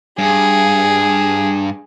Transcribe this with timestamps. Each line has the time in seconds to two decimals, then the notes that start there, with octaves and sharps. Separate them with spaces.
0.18 G2 G#4